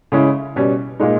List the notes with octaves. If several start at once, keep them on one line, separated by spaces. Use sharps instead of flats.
C#3 G#3 C#4 E4
B2 G3 C#4
A#2 G#3 D#4